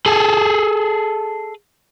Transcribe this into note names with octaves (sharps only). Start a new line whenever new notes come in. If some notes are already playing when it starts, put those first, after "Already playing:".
G#4 A4